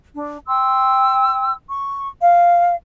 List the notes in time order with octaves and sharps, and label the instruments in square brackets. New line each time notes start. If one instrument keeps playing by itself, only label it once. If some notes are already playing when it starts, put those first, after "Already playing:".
[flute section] D4
G5 C6 E6
C#6
F5